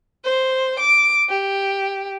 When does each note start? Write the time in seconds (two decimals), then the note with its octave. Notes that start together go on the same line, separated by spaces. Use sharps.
0.24 C5
0.80 D6
1.29 G4